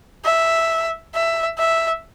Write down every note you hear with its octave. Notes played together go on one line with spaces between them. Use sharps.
E5
E5
E5